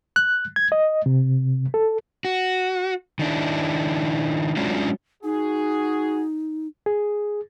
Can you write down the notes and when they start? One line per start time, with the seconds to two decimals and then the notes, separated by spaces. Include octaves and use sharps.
0.16 F#6
0.56 G#6
0.72 D#5
1.06 C3
1.74 A4
2.25 F#4
3.19 D#3 D4 E4
4.57 F#3 G#3 C#4 D4 E4 F4
5.24 D#4 F#4 G#4
6.86 G#4